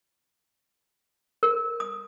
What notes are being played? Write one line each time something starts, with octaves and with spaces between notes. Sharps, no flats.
A#4
D#6